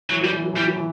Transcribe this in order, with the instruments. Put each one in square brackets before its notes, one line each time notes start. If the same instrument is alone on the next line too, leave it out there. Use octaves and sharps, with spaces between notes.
[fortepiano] E3 [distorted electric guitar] F#3
[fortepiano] F#3 [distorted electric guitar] G3
[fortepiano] E3
F#3
[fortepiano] E3 [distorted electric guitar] G3
[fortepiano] F#3
E3